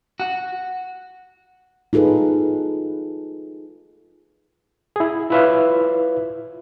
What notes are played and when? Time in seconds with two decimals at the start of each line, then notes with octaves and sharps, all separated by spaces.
0.20 F#4
1.93 D#4 F4 G#4 A4 B4
4.96 E4 G#4
5.30 E4 F4 B4 C#5 E5 F5